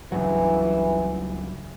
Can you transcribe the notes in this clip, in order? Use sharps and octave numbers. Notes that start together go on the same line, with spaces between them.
C#2 G2 E3 F#3